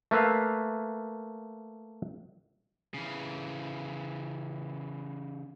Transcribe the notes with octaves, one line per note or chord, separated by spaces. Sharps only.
A3 A#3 B4 E5 F5
C#3 E3